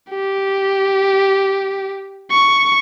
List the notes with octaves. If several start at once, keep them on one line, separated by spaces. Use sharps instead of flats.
G4
C#6